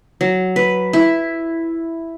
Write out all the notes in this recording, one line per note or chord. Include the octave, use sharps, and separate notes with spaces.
F#3
B4
E4